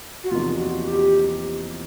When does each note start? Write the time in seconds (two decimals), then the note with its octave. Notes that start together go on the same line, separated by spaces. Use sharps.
0.24 F#4
0.31 E2 C3 F3 A#3 D#4 F4
0.59 F#4
0.87 G4